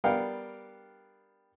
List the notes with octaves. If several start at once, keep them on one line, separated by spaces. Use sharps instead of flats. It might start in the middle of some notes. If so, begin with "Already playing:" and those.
G3 B3 D4 A#4 F5 G5